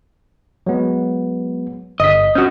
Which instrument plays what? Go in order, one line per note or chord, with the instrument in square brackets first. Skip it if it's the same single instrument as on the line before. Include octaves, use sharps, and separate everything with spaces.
[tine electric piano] F#3 G#3 B3
[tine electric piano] G1 B6 [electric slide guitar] D#5
[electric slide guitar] C#4 F#4 [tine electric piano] D#6 F6 G6